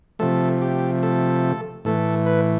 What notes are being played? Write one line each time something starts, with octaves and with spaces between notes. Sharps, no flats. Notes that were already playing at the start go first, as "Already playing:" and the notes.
C3 F3 A3 A4
G4
A4
A2 E3 A3 A4
B4